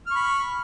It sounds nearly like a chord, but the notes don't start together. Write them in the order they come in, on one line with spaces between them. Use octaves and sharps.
F6 C#6 B5